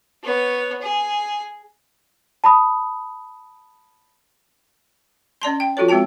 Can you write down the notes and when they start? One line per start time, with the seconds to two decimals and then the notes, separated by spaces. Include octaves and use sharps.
0.23 B3 C#5
0.81 G#4
2.44 A5 B5 D#6
5.42 C#4 D5 A5 C6
5.60 G5
5.77 F3 F4 F#4 A4 C#5
5.88 G#3 C4 F#4 G5 A5